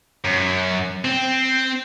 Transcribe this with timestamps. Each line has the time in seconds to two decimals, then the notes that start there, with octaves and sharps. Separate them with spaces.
0.25 F#2
1.05 C4